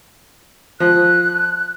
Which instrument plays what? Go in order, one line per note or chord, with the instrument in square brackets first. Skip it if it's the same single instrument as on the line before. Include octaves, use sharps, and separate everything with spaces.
[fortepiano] F3 [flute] F#6